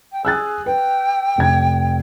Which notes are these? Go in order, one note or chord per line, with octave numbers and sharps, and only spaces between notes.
G5
G#4 E6 F#6 A6
B4 G5
F1 G#6